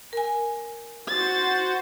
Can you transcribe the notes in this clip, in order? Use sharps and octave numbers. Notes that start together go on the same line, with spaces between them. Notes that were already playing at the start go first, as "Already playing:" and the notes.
A#4 G#5
F#4 C5 A6